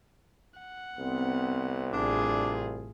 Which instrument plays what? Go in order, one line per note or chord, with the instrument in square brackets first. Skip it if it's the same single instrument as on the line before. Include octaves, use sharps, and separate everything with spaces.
[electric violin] F#5
[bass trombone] C2 [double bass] B3 C4
[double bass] A1 A3 [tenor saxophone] D4 [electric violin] F4 G#4